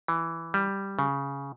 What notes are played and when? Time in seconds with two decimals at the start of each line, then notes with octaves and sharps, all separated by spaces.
0.08 E3
0.54 G3
0.99 C#3